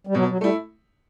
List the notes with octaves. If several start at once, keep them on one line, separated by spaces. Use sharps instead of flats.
G3
B2 F#3
F#3
G3 A3 E4